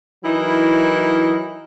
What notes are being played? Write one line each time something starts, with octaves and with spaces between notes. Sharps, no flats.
E3 F#3 D#4 E4 A#4